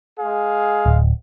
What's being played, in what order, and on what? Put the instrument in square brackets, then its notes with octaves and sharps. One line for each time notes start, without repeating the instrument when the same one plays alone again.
[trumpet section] G#3 G#4 F5
[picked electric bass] D1